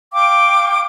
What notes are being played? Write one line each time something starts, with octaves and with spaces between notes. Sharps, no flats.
F5 G5 D6